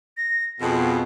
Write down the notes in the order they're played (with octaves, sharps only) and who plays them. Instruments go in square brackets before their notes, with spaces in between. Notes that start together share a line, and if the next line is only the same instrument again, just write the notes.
[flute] A#6
[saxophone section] F2 B2 [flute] G#4